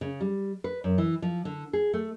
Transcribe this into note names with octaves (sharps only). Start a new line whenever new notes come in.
C#3
G3
B4
F#2
E3
F3
D3
G#4
A3